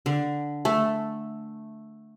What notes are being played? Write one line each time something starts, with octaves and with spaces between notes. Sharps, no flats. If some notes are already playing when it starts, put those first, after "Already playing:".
D3
A3